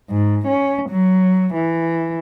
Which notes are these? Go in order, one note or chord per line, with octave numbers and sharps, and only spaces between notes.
G#2
C#4
F#3
E3